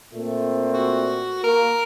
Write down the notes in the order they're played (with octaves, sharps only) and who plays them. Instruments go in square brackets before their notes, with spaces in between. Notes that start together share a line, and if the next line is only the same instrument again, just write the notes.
[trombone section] A#2 A3 C4
[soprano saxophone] F#4
[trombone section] A#3 [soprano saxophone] A#4